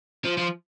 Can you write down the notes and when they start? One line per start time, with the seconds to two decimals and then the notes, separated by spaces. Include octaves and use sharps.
0.25 F3
0.37 F3